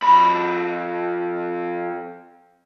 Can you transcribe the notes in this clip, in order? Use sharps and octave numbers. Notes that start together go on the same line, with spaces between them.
F2 B5